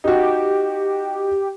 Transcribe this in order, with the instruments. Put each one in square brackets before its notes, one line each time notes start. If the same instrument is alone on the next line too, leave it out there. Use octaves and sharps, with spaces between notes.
[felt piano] D#4 F#4 [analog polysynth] G4